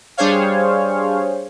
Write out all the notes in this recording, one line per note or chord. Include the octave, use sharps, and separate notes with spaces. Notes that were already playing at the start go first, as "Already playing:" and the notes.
G3 D4 G#4 C5 C#5 F5